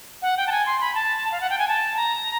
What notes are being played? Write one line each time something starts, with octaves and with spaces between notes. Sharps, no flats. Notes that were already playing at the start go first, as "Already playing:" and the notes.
F#5
G5
A5
G#5
C6
B5
A5
F5
F#5
G5
G#5
A5
A#5